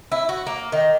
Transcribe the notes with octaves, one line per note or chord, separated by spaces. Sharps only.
E4
F#4
A#3
D#3